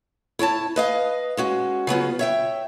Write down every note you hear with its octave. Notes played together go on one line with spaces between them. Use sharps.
E4 C#5 G#5 A5
B4 D#5 F5
G#3 C#4 F#4
C#3 F#3 B3 F4
C#5 E5 G5